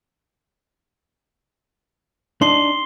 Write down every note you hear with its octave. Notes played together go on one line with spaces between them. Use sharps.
D4 D#4 C6 C7 G7